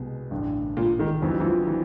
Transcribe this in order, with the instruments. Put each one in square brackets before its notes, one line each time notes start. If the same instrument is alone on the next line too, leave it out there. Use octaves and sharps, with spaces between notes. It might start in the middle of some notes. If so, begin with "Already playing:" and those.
Already playing: [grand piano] C2 B2 G#3 B3
A1 G2 D3
[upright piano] A#2
D#3
[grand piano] F2 D3 F#3 B3 [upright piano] E3
[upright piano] E3
F3
E3